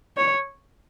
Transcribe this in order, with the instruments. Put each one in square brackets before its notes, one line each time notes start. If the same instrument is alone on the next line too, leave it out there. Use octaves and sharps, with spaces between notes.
[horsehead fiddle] C#5